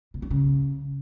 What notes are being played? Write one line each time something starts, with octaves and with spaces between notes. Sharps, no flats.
B2
G2
C#3